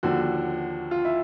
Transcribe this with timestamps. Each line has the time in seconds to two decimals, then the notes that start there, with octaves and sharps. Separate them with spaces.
0.03 D#2 D3 F3 F#4
0.91 F4
1.05 E4